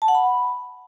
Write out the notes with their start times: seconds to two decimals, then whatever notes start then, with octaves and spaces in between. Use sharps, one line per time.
0.02 A5
0.08 F#5
0.15 B5